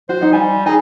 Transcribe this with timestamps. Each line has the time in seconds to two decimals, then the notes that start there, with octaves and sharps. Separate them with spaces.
0.09 F#4 C5
0.21 D#4 F#5
0.33 G3 G#5
0.66 D#4 G#4 A4 G#5